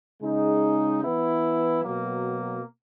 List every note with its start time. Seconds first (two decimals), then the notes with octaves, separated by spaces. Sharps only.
0.22 C#3 G#3 D#4
1.02 E3 B3 E4
1.82 B2 F#3 A#3